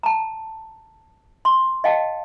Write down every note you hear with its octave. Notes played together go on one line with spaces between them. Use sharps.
A5 A#5
C6
D#5 F5 G5 A5